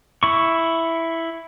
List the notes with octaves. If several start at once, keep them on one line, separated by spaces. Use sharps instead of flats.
E4 C#6